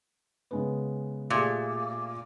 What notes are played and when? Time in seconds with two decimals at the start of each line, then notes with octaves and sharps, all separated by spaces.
0.51 C#3 G#3 B3
1.30 A#2 A3 G4 G#4